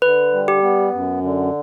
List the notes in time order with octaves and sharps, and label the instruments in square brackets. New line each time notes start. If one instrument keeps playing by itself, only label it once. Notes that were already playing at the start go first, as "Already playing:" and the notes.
[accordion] D3 [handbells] B4
[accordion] G3
[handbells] G4
[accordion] B3
F#2
D3